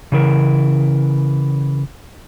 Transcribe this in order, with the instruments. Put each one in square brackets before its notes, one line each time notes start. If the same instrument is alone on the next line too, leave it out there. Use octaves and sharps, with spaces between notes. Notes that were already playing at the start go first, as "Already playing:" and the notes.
[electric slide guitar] C#3 E3 A#4